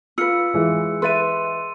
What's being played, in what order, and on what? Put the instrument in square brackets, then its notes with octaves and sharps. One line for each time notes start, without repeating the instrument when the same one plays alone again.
[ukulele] F4 B4 [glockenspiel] E6 C#7
[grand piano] E3 G#3
[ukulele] B4 E5 [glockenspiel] C6 A6 D#7